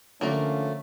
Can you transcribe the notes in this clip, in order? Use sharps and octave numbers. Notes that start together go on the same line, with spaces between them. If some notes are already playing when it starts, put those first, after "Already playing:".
D3 F3 A3 A#3 C#4 D4 A#4